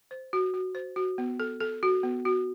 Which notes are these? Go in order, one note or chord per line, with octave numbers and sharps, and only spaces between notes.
C5
F#4
F#4
C5
F#4
B3
A4
A4
F#4
B3
F#4